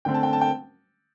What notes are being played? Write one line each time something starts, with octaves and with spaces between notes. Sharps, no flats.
D3 A3 C4 G5
A5
G5
A5
G5